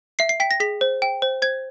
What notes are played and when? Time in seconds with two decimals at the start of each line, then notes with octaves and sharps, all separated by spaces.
0.19 E5 C7
0.29 C7
0.40 G5 B6
0.51 A#6
0.60 G#4 B6
0.81 C5
1.02 G5
1.22 C5
1.42 C5 G#6